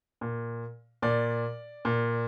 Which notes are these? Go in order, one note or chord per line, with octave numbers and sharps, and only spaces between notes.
A#2
A#2 D5
A#2